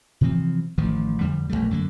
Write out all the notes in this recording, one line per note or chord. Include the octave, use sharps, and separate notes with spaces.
C3 E3 F3 C4
A1 D#3 F3
F2 D3 G3
A#1 F2 G3 A3
F#2 D3 F#3 A#3